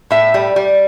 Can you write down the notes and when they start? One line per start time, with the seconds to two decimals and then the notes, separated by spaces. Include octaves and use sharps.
0.11 A2 E5
0.34 G3
0.56 G3